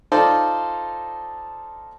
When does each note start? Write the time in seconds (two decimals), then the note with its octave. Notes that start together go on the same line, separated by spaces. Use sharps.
0.12 D#4 F4 A4 C5 D5